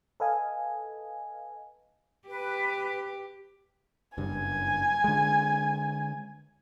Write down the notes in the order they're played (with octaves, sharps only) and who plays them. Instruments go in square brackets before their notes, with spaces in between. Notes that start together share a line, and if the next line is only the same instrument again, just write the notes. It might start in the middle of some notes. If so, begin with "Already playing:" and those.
[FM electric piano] A4 B4 D#5 F5 G#5
[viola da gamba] G4 [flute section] B4
[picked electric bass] F#1 G2 [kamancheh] G#5
[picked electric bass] D3 G#3